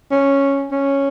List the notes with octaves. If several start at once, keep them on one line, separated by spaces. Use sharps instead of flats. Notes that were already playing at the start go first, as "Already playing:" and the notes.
C#4
C#4